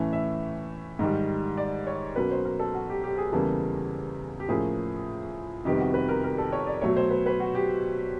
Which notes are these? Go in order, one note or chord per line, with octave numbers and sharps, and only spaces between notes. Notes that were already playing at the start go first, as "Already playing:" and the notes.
Already playing: A2 E3 A3 C#4
E5
G#2 D#3 G3
D5
C#5
B2 F#3 A#3 C#4 B4
C5
A#4
A4
F#4
G4
G4
G#4
E2 C#3 E3 G3 A#3 A4
G4
A2 F3 A#3 C#4 G#4
F2 C3 D#3 G3 B3 G4
F#4
B4
A#4
A#4
A4
C#5
D5
B2 F#3 A3 C#5
C5
B4
B4
F#4
G4